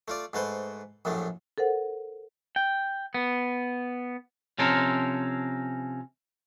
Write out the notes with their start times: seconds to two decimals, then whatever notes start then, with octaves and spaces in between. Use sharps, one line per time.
0.08 A3 F4 D5
0.33 G#2 A3 B4 C5
1.05 A#1 F#2 A2 A3
1.58 A4 A#4 C5 F#5
2.56 G5
3.14 B3
4.59 C3 F3 C#4 A4 A#4 C5